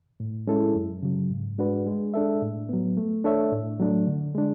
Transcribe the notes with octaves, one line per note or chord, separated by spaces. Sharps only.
A2
G#3 C#4 E4 A4
F#2
C#3 F#3
G#2
G#3 D4 F#4 B4
G#3
D4 A4 E5
A2
F#3 B3
A3
D4 A4 C#5 E5
A2
F#3 A3 D4
D3
G#3 D4